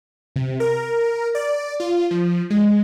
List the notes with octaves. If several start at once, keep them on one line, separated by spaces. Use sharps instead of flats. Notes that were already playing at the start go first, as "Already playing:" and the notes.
C3
A#4
D5
F4
F3
G#3